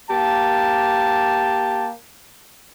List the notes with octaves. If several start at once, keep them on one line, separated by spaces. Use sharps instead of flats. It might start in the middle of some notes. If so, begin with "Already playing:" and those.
A#3 G4 A5